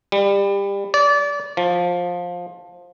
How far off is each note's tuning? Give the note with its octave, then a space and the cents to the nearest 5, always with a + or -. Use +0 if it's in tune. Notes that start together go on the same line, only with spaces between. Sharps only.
G3 +25
D5 -25
F3 +15